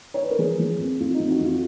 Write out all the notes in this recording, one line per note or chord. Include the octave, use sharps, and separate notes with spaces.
C#5
B4
A#4
F3 G#4
F3
F2
F2 F4
D#4
F2
F#4
F2 F4